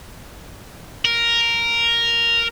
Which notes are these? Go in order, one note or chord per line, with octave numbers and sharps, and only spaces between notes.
A#4